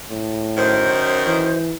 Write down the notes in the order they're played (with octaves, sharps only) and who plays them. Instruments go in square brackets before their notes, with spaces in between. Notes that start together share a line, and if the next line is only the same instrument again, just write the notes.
[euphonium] A2
[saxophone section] F#2 D#3 [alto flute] C5
[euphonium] E3